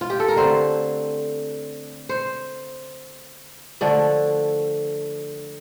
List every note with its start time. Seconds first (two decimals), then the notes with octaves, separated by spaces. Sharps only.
0.01 F4
0.10 G4
0.20 A4
0.29 A#4
0.36 D3 A3 C4 C5
2.09 C5
3.81 D3 F3 A3 D4 D5